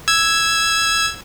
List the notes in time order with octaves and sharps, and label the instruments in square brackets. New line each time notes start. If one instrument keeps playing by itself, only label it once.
[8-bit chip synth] E6 G#6